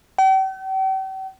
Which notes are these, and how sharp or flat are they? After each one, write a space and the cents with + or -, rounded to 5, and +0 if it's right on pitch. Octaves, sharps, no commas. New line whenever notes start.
G5 -45